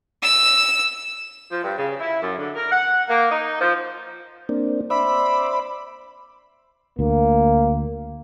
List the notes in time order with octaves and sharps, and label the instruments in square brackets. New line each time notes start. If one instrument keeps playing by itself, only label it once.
[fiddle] E6
[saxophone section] F3
G2
C#3
E4
F#2
D3
A#4
F#5
A#3
D#4
F3
[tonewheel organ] A#3 C4 D4
[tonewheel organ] C5 D5 E5 [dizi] B5
[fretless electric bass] D2 [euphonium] A#3